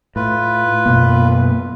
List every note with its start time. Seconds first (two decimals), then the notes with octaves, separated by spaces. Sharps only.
0.16 A2 F4 B4
0.86 F#2 B2 A#3